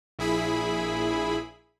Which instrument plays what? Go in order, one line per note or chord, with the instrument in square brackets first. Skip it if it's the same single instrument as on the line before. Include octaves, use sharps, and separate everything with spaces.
[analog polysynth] A#1 E4 G#4 B5